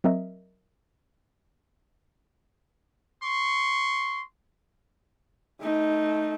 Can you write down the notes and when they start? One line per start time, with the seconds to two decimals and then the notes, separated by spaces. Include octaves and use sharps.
0.04 F#3 C4 A#4 D#5 E5
3.22 C6 C#6
5.61 A3 D#4